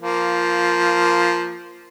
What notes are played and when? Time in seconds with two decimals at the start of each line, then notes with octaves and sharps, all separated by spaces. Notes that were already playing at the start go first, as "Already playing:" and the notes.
0.01 F3 A#3